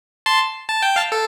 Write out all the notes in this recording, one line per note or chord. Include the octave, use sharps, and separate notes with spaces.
A5 C6
A5
G5
F5 A5
A4